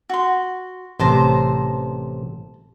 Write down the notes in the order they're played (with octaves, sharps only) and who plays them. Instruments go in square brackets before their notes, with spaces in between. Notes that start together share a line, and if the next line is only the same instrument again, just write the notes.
[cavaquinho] F#4 C6
[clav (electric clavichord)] A1 C3 [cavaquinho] C5 A5 A#5